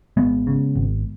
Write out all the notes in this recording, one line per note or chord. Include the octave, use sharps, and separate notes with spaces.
G#1 G#3 B3
C#3
G#1